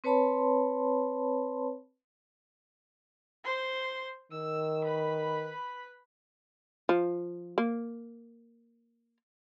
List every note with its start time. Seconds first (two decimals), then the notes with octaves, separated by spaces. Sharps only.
0.04 C4 B4 C#5 A5 B5 C6
3.44 C5 C6
4.32 D#3 E6
4.84 B4 B5
6.89 F3
7.58 A#3